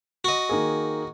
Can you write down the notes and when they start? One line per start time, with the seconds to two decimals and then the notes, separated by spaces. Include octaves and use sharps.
0.24 F#4 D#5
0.49 D#3 A#3 G#4